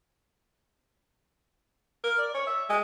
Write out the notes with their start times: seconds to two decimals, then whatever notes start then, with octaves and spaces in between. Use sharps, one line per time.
2.04 A#4
2.18 D5
2.34 C#5
2.47 E5
2.70 G#3